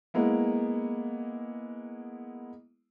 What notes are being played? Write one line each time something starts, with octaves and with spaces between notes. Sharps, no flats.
G#3 A#3 B3 E4